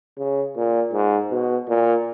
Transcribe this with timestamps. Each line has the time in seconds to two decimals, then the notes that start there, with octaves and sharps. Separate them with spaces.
0.18 C#3
0.56 A#2
0.93 G#2
1.31 B2
1.69 A#2